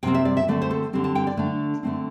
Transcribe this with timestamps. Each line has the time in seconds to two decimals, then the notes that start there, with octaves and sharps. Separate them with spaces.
0.03 C3 G3 C4 G5
0.14 E5
0.25 D5
0.37 E5
0.48 D3 A3 C4 D5
0.62 C5
0.70 A4
0.93 D3 G3 C4
1.04 A5
1.15 G5
1.27 D5
1.37 D3 A3 D4
1.83 D3 A3 C4